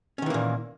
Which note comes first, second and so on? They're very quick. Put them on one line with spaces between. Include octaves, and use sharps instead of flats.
C#4 D#3 E3 A#3 A#2